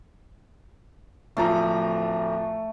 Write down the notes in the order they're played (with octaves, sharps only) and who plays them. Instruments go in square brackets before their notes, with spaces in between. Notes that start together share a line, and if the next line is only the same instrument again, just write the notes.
[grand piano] D1 F3 A#5 [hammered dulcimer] A3